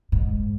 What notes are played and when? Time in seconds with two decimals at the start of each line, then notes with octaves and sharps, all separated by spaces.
0.12 G#2